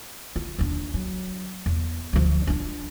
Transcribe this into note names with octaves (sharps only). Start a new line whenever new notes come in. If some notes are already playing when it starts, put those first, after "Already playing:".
F4
D#2 D4
F#3
E2
D2 F3
D4 F4